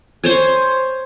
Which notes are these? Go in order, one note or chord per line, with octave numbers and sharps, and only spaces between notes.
C5 C#5 G#5